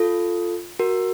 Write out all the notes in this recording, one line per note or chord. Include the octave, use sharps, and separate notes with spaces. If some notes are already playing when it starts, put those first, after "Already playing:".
Already playing: F4 A4
F#4 A#4